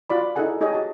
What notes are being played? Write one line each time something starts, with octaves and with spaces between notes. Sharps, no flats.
F4 F#4 D5 B5
D#4 E4 G#4 A4 F#5 G#5
D#4 G4 G#4 C#5 D#5
F#4 A5